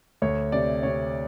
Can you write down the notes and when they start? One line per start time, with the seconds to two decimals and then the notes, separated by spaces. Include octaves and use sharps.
0.22 D2 C#5
0.52 C3 D5
0.83 C3 C#5